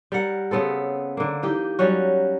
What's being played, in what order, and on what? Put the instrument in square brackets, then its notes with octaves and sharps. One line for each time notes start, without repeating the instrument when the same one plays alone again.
[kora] G3 A#4 F#5
C#3 B3 C4 A4
D3 A#3
E3 D#4 G4
F#3 G3 C#4 F#4